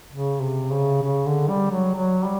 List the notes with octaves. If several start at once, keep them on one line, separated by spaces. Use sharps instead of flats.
C#3
C3
C#3
C#3
D3
G3
F#3
F#3
G3